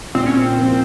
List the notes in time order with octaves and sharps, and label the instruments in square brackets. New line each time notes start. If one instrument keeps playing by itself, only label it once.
[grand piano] A#2 [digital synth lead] C4
[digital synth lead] C#4
C4
[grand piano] F3 A#3